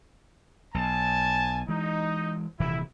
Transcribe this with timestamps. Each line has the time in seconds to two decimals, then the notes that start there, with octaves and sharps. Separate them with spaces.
0.74 B1 G#5 A5
1.69 E3 G#3 D#4
2.60 D#1 C3 E3 E4